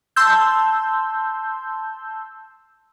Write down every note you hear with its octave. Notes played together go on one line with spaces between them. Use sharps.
A5 C6 E6 G6